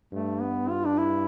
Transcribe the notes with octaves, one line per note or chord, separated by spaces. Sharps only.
G2 A3
B3
F4
D4
E4